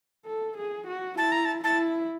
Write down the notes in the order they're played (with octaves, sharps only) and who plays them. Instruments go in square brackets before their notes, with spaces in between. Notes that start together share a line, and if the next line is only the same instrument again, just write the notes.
[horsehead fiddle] A4
G#4
F#4
[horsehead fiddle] E4 [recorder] A5
[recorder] A#5
A5
[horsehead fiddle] E4 [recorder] A5